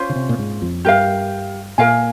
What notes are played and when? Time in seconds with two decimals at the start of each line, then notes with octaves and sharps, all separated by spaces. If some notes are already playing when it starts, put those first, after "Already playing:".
Already playing: C#4 F4 C5
0.10 C#3
0.16 C3
0.29 A#2
0.39 G#2
0.62 F2
0.85 G2 G4 A#4 F5
1.78 A#2 A#4 F5 G#5